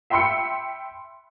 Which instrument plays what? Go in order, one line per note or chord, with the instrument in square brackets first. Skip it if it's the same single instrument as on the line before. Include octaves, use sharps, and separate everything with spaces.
[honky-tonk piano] E5 G5 B5 C6 E6 C#7